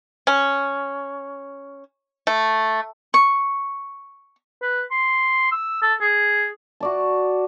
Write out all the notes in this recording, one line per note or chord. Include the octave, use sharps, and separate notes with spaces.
C#4
A3
C#6
B4
C6
E6
A4
G#4
F#4 D5 A5